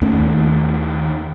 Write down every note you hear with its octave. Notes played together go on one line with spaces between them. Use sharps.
D#2 D#3 A3 C#4